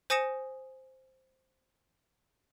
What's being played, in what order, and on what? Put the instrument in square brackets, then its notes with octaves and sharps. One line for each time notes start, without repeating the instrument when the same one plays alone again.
[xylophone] C5 G#5 D#6 A#6 C#7 E7